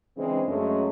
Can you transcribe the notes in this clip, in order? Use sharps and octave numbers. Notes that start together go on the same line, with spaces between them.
C#3 E3 G#3 C4 D4
F#2 F#3 G#3 A3 C#4